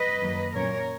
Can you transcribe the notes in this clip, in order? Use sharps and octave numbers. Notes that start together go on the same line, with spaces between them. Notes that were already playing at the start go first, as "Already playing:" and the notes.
Already playing: B4 D#5
F#2 D#3 F#3 A#3
A#2 F#3 A#3 C#4 A#4 C#5